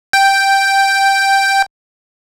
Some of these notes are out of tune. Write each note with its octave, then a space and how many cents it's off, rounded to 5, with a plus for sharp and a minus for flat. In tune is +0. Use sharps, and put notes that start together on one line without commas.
G5 +0